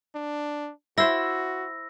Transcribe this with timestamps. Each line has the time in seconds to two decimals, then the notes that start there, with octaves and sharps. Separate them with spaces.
0.15 D4
0.98 E4 F#4 C5 E5 E6 A#6